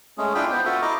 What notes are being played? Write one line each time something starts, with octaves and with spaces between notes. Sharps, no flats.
G#3 A3 C#4 G#4
D4 E4 F4 G5 B5
B3 C5
F4 F#4 A4 E5 F#5
E4 D#5 A#5 D6